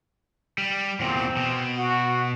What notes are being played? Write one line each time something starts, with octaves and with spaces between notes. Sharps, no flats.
G3
E2 A#2 C4
B2
F#4